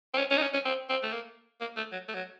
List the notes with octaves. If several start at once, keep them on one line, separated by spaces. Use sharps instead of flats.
C4
C#4
C#4
D#4
C#4
C#4
C4
C4
A3
A#3
A#3
A3
F#3
A3
F#3